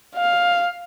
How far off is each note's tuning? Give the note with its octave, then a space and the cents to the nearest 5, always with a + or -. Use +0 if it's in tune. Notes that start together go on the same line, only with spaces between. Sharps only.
F5 +5